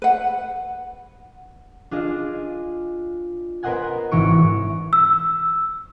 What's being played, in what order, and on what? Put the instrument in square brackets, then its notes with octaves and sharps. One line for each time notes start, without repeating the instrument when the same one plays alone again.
[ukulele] B4 F#5
[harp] D4 F4 G#4 D#5
B3 A#4 C5 D#5 F#5 G#5
G#1 E3 D#4 C#5 C#6 D7
[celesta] E6